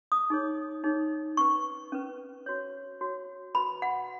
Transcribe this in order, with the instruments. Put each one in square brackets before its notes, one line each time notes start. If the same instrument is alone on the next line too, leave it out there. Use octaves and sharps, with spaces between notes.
[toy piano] D#6
D#4 G#4 C#5
D#4 G#4 C#5
C#4 B4 C#6
C#4 B4
F#4 C#5
F#4 C#5
F#4 B4 B5
F#5